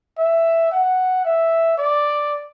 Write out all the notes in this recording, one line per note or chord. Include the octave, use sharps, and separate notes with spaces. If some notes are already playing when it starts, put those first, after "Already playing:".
E5
F#5
E5
D5